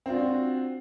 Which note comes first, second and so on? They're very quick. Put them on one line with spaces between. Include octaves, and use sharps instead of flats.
C4 F4 D4 F#4